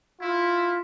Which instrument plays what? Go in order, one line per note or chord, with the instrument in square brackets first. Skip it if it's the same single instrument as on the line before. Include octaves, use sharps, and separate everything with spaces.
[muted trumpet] E4 [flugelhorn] F4